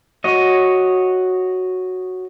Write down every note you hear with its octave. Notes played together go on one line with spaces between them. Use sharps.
F#4 C#5 D#5